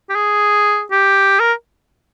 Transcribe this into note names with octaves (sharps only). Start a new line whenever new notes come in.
G4
G#4
G4
A#4